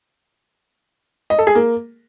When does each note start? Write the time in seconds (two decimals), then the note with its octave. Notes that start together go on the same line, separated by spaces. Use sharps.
1.30 D#5
1.39 A4
1.47 G#4
1.55 A#3